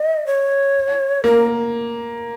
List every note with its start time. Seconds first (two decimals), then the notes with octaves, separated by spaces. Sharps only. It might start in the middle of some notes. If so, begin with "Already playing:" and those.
Already playing: D#5
0.26 C#5
1.24 A#3 A#4